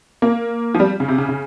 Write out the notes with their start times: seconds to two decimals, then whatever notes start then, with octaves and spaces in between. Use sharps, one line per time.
0.22 A#3
0.75 F3
0.80 G3
1.00 C#3
1.08 C3
1.18 C#3
1.29 C#3